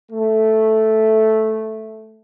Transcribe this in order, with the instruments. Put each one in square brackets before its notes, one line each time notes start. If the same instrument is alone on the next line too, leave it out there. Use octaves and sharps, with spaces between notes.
[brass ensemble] A3